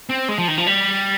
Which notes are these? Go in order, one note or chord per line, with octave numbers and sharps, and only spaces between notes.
C4
G#3
F3
D#3
F3
G3